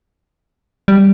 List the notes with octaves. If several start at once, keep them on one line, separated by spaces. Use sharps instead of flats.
G3